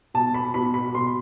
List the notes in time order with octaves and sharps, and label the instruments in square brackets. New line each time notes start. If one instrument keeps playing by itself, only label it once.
[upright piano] B2 A5
B5
B2 B5
B5
B2 C6